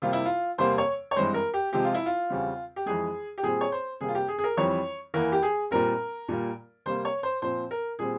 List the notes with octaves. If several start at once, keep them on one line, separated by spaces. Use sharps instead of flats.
C3 G3 A#3 F4
E4
F4
E2 C3 G3 A#3 C5
C#5
C#5
G2 E3 G#3 C4 C5
A#4
G4
C3 F3 G#3 C4 G4
F4
E4
F4
E2 C#3 G3 C4
G4
F2 E3 G#3 G#4
G4
A#2 G3 C4 G#4
C#5
C5
C3 G3 A#3 G#4
F4
G4
G#4
G#4
A#4
F2 E3 G3 C4 C#5
E2 E3 A#3 A#4
G4
G#4
A#2 G3 C4 A#4
A#2 G3 A#3
C3 G3 A#3 C5
C#5
C5
A#2 F3 C4 C5
A#4
A#2 G3 C4 G#4